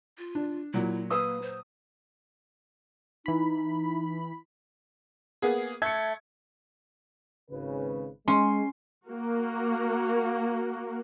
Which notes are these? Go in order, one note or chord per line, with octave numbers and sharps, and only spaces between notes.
F4
D4
A#2 F#3 E4
A#3 B4 D#6 E6
C5
E3 D#4 B5
A#3 B3 G#4
A3 G#6 C#7
G#1 C#3 B4
G#3 C#4 C6
A#3 F#4